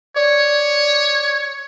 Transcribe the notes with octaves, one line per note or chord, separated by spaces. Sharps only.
C#5 D5